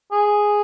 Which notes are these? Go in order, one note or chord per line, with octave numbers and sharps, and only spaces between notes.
G#4